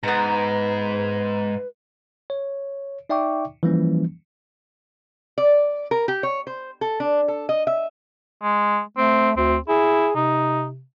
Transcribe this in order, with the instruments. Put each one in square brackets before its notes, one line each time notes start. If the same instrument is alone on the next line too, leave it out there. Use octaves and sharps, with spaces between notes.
[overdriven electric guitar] G#2 [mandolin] B3 A#5 [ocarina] B4
[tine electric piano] C#5
D#4 D5 E5 G5 C#6 D6
E3 F3 G3 A#3 C#4
[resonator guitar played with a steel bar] D5
A#4
G4
C#5
C5
A4
D4
A4
D#5
E5
[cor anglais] G#3
[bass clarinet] A3 [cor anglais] C4
[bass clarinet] D2 [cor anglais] C4
[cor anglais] E4 [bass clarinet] G#4
[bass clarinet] C3 [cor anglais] D#4